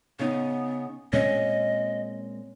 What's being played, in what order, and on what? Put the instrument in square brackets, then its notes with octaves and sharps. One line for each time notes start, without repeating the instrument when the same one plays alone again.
[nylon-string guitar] C#3 D#4 [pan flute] B3
[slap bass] A#2 G#3 C4 [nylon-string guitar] C#4 [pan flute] D#5